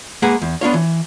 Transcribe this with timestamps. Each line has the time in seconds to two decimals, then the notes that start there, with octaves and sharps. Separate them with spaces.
0.22 G#3 A#3 G#4 B4 F#5
0.42 E2
0.61 B3 D4 F4 C#5
0.74 E3